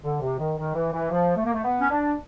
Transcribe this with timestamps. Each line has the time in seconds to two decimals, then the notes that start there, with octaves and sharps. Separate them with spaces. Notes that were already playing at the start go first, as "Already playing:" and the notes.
0.04 D3
0.21 C3
0.39 D#3
0.58 D#3
0.75 E3
0.93 E3
1.11 F3
1.36 A3
1.45 A#3
1.53 A3
1.64 B3
1.80 C#4
1.90 D4